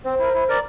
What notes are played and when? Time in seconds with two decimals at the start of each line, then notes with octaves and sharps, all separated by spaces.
0.04 C4 C5
0.19 E4 A#4
0.34 E4
0.48 A#4 D5